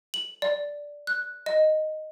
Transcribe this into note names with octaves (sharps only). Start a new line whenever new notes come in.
F#7
D5
F#6
D#5